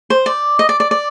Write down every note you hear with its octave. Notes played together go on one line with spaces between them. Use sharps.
C5
D5
D#5
D5
D5
D5